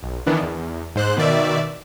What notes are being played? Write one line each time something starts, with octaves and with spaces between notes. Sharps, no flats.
B1
D#3 E3 B3 D4
E2
G#2 C5 F#6
B2 D#3 D5 E5